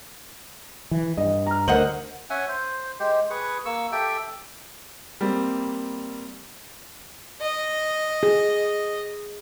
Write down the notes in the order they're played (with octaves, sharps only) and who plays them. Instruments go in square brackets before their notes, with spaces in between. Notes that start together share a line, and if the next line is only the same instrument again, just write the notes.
[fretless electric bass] E3
[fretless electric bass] G2 [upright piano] D#5
[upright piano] A#5 F6
[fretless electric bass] D2 [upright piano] A#4 F#7 [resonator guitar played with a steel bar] C5 D#5 F#5
[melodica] C#4 E5 F#5 G#5
C5
G#3 G4 C5
G#4 B4 C#6
A#3 C#6 E6
G4 A4 E5 G5
[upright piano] G3 A#3 C4
[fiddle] D#5
[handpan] G#4